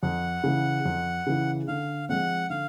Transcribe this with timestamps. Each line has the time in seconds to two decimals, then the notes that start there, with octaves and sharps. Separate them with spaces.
0.03 F2 F#5
0.44 C#3 E3
0.85 F2
1.27 C#3 E3
1.68 D3 F5
2.09 F3 G#3 C4 F#5
2.50 D3 F5